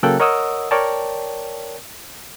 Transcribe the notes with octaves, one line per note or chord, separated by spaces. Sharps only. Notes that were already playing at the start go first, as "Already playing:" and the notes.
C#3 F#3 A#3 A4 G5 F#6
A#4 C#5 D#5 F#5 D#6 E6
A#4 C#5 D5 G5 A5